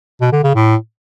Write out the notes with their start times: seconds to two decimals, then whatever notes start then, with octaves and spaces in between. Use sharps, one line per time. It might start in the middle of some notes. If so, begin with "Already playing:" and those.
0.21 B2
0.32 D3
0.44 C#3
0.55 A2